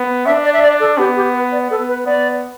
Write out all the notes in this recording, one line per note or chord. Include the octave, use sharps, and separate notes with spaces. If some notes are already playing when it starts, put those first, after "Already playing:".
Already playing: B3
D4 E5
D5
E5
D5
A4
B3 G4
G4
B4
D5
B3 A4
B4
B3 D5